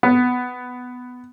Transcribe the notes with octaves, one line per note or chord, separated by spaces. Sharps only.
B3